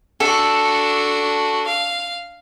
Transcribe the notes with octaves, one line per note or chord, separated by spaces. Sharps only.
D4 F#4 A4
F5